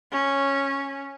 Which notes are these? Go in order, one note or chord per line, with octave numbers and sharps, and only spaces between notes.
C#4